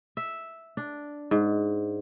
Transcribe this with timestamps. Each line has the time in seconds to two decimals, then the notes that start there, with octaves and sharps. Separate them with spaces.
0.17 E5
0.77 D4
1.31 G#2